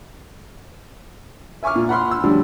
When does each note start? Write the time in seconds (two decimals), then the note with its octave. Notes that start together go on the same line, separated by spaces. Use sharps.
1.63 E5 G#5 C#6 D6 F6
1.76 A#2
1.89 F#5 B5 C6 F6
2.11 E6
2.24 D2 F3 G3 C#4 D4